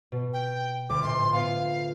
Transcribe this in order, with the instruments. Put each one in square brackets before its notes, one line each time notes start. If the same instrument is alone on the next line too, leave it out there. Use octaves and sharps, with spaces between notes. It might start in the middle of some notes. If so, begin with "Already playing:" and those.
[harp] B2
[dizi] G5
[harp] D2 [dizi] D6
[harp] A#1 A2 [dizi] C6
[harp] B3 F4 [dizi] F5